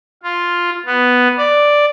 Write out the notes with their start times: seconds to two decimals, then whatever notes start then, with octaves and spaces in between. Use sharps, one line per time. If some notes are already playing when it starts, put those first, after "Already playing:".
0.23 F4
0.86 B3
1.37 D5